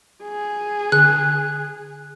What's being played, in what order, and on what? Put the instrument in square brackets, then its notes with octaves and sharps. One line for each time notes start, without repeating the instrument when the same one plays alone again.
[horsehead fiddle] G#4
[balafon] D3 [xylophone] F#6